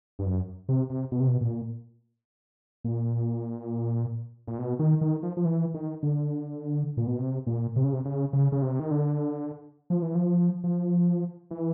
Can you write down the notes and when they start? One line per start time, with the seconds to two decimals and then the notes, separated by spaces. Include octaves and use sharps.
0.19 G2
0.26 F#2
0.69 C3
0.90 C3
1.12 B2
1.20 C3
1.28 B2
1.41 A#2
2.84 A#2
4.47 A#2
4.59 B2
4.79 D#3
5.01 D#3
5.23 F3
5.37 F3
5.45 E3
5.74 D#3
6.03 D3
6.97 A#2
7.07 B2
7.18 C3
7.47 A#2
7.76 C3
7.84 C#3
7.93 C3
8.05 C#3
8.33 C#3
8.52 C#3
8.62 C3
8.80 D#3
8.91 D3
9.90 F3
10.02 E3
10.15 F3
10.64 F3
11.51 E3